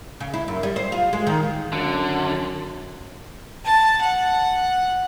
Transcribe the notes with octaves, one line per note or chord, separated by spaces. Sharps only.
C#3
E4
F#2
G3
C5
F4
G#3
D#3
F#2 D3
A5
F#5